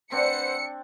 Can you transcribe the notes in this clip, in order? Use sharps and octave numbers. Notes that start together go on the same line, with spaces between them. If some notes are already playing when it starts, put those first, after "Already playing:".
C4 D4 B4 C5 F#5 C#7